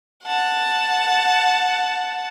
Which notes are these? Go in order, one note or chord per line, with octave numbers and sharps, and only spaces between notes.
F#5 A5